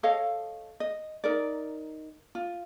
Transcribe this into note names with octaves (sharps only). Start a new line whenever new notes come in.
A4 C#5 D#5 F5
D#5
D#4 A#4 D5
F4